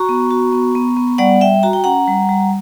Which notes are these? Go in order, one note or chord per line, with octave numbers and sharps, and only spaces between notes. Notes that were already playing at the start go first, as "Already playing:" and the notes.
Already playing: F#4 A#5 C#6
B3
F#4
B3
B3
B3
G3 D5 F#5
G3 E5 G5
F#4 A#5
G5
C#4 F#5 A#5
G3
G3